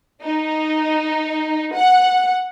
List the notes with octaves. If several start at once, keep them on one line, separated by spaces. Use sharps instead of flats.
D#4
F#5